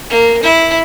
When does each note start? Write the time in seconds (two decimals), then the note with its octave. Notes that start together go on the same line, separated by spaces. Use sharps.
0.10 A#3
0.43 E4